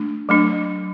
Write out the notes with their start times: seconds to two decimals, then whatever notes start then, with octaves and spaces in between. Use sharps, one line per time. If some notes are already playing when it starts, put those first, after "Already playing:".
Already playing: A3 D4
0.29 F#3 A3 D4